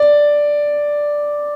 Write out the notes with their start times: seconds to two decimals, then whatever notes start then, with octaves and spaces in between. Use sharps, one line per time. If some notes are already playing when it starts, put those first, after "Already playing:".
Already playing: D5